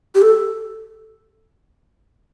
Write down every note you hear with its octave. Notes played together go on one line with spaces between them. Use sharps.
G4
A4